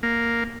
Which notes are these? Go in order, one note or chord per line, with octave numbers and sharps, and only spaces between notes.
A#3